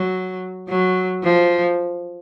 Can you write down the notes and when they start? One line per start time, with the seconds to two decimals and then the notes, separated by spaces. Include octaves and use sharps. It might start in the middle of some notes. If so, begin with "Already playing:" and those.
Already playing: F#3
0.69 F#3
1.23 F3